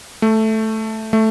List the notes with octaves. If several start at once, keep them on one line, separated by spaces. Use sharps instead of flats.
A3
A3